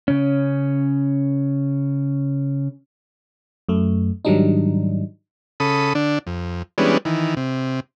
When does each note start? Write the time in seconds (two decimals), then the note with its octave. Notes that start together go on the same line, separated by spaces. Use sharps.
0.08 C#3 C#4
3.69 F#2 A3
4.25 G#2 D#3 F#3 G3 D4 D#4
5.60 C#3 A4 B5 D#6
5.95 D3 D4
6.27 F2
6.78 E3 G3 G#3 B3 C#4 D4
7.05 D#3 E3
7.37 C3